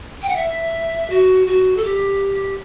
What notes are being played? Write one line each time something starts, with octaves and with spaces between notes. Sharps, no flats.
G5
F#5
E5
F#4
F#4
A4
G4